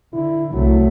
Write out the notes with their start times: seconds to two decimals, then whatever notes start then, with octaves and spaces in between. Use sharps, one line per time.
0.14 D3 E4
0.53 C2 F#3 A3